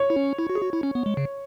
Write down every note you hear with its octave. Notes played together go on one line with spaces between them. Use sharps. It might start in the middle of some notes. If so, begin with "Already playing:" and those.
Already playing: C#5
E4
C#4
E4
F#4
G#4
F#4
E4
C#4
B3
G#3
C#3